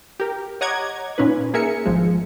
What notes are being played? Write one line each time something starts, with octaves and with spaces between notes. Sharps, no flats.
G4 A#4
C#5 D#5 F#5 A#5 D6 G#6
A#2 C#4 D#4 B4
A#3 G#4 A#4 E5 G#5 C#7
G#1 F3 G#3